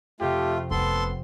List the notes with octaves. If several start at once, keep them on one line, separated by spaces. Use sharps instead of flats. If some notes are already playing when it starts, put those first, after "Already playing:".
F2 C3 A3 F4 G4
F1 B3 A4 C6